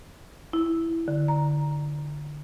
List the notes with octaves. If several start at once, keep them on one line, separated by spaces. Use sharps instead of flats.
E4
D3
A#5